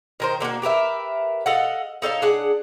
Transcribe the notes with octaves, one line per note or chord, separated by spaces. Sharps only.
D#3 A#4 C5
D3 A#3 D4 F#4
G4 A#4 B4 E5
A4 D#5 F5 F#5
D#4 A4 C#5 F5
D4 G#4 F#5